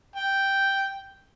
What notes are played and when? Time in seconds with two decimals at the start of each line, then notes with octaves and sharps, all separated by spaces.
0.16 G5